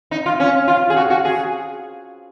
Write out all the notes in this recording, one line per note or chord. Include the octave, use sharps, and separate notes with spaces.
D#4
F4
C#4
F4
G#4
F#4
F#4
G#4